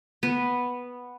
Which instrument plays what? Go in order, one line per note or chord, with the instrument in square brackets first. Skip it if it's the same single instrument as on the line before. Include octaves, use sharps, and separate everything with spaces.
[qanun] B3